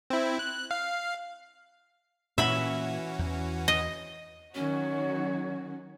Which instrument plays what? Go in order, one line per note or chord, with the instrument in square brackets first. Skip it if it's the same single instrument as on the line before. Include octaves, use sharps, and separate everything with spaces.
[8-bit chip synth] C4 E4
F#6
F5
[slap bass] A#2 A#3 [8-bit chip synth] E3 C#4 F#4 [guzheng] E5 B5
[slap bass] E2
[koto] D#5
[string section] D#3 F#3 F#4 [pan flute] C#4 [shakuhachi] C#5